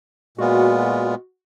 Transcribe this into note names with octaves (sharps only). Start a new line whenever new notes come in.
A#2 G#3 B3 F4 F#4